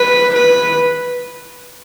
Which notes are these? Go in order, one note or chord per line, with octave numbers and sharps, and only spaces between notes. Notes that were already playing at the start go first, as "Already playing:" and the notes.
Already playing: B4
B4